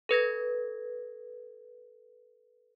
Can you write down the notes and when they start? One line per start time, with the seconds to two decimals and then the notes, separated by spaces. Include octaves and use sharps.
0.09 A4 B4 G#6 A#6